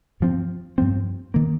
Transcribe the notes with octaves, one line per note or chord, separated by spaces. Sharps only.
G2 F3 C4
G2 F3 C4
D#3 A#3